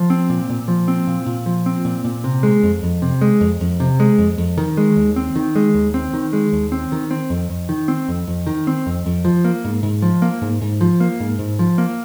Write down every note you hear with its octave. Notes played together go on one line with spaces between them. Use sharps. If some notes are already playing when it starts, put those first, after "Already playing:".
Already playing: F3
C4
A#2
A#2
F3
C4
A#2
A#2
F3
C4
A#2
A#2
C3
G#3
F2
F2
C3
G#3
F2
F2
C3
G#3
F2
F2
D#3
G#3
D#2
C4
D#3
G#3
D#2
C4
D#3
G#3
D#2
C4
D#3
C4
F2
F2
D#3
C4
F2
F2
D#3
C4
F2
F2
F3
A#3
G#2
G#2
F3
A#3
G#2
G#2
F3
A#3
G#2
G#2
F3
A#3